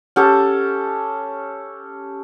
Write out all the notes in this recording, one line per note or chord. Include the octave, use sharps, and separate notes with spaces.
C#4 G4 A4 A5